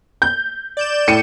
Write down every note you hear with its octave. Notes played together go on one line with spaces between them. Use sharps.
G6
D5 G6 E7
A2 C#7 D#7